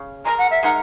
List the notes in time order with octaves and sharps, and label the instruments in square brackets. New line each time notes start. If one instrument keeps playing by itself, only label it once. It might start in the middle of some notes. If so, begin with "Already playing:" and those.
Already playing: [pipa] C#3
[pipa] G#3 D#4 A#4 [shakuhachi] A#5
[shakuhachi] F#5
E5
[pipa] G#3 D#4 A#4 [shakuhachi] F#5